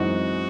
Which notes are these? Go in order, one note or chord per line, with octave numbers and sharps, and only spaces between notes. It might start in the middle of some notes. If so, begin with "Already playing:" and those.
Already playing: F#2 E3 G#3 C4 D#4 F#4